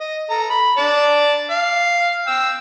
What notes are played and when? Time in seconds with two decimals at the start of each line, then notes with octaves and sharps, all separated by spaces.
0.01 D#5
0.30 A4 A#5
0.50 B5
0.78 D5 A5
1.51 F5
2.28 G5 E6